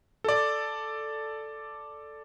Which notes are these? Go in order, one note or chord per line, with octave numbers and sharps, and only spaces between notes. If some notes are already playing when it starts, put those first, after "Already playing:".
A4 D5